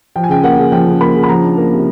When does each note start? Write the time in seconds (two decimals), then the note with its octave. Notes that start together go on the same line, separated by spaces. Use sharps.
0.16 F3 G5
0.23 G#5
0.29 C#3 G5
0.44 A#3 F#5
0.58 C#3
0.72 F3 G5
0.87 C#3
1.01 A#3 B5
1.15 C#3
1.23 B5
1.29 F3 A#5
1.44 D4
1.58 A#3
1.72 C3